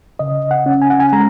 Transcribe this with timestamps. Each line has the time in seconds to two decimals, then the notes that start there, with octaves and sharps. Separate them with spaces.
0.19 C#3 D#5
0.51 F#5
0.66 C#4
0.82 G#5
0.90 F#5
1.00 G#5
1.13 G#3 A#5